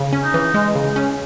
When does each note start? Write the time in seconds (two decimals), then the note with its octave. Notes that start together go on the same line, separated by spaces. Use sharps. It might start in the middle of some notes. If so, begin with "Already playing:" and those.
Already playing: C#3
0.13 C#4
0.24 D#4
0.34 E3
0.54 G#3
0.75 C#3
0.96 C#4